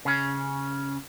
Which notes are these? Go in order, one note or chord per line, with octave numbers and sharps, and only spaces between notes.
C#3 C#4